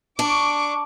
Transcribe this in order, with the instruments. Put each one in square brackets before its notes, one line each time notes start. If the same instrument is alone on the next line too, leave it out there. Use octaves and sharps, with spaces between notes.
[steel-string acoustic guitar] D4 [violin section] C#6 D6